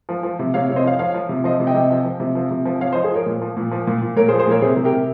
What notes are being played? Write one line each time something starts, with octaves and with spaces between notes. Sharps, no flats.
F3
F3
C3
C3 C#5 F5
C3 C#5
C5 D#5
F3 C#5 F5
F3 C#5 F5
F3
C3
F3 C5 D#5
C3
D#5 G5
C3
F3
F3
C3
F3
C3
F3
F3 C#5 F5
C5 D#5
F3
G#4 C5
F3 A#4 C#5
A#2
F3
A#2
F3
A#2
A#2
A#2 A#4 C#5
G#4 C5
F3
G#4 C5
A#2 A#4 C#5
C3 G#4 C5
C3
G4 A#4
C3